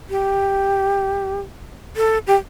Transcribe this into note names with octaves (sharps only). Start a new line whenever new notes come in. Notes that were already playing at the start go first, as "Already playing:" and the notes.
G4
A4
G4